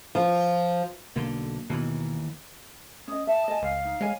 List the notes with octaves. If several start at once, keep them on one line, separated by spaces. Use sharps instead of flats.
F3
B1 D3 A#3
D#2 B2 E3
C#4 D#5 D#6
E5 A5
D#5 G#5
C#2 F5
D#4
G#3 C#5 G#5